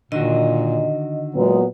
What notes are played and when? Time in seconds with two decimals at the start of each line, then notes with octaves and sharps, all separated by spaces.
0.12 A#2 D3 D#3 F#4 D#5
1.35 A#2 F#3 G#3 B3